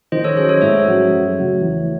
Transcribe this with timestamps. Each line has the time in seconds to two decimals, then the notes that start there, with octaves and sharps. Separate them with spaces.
0.12 D#3 C5 D#5
0.24 A4 C#5
0.37 F#3 C#4 G#4 C5
0.49 A4 C#5
0.61 G#2 C#5 E5
0.86 F#3 C#4 G#4
1.11 F#2
1.36 C#3 F#3 A3 C#4
1.61 E2